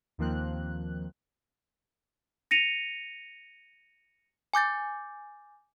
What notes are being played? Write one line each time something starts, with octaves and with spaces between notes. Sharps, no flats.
D#2 D#3 F3 A#3 C4 F#6
A#6 C#7 D#7 F7
G#5 D6 G6 A6